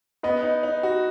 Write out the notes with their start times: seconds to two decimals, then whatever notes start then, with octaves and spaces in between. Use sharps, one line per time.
0.23 B3 B4 D#5
0.43 D#4
0.63 D#4
0.83 F#4